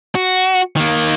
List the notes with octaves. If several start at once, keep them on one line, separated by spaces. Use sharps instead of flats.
F#4
D#3 A#3